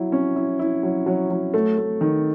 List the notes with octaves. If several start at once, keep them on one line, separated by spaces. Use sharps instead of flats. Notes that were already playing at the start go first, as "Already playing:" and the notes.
Already playing: F#3 E4
C#4
E4
E4
F#3
F#3
F#3
A3
A3
D#3